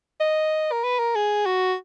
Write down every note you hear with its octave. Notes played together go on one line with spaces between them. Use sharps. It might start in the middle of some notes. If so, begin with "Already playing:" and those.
D#5
A#4
B4
A#4
G#4
F#4